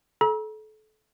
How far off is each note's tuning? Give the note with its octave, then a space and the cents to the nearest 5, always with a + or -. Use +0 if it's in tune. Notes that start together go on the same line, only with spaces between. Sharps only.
A4 -30 A#5 +40